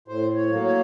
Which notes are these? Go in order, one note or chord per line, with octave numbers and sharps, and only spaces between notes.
A2 C5
C#5
F#3 A#3
C#5